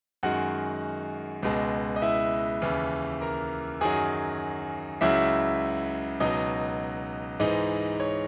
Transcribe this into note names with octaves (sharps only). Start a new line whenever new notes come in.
F#2 D#3 G#3 F#4 F#5
C#2 B2 G#3
D#5
E4 E5
D#2 C#3 E3
A#4 A#5
F#2 D#3 F#3 G#4 G#5
C#2 C#3 F#3 E4 E5
C#2 B2 F#3 D#4 D#5
G#2 E3 G#3 D#4 D#5
C#5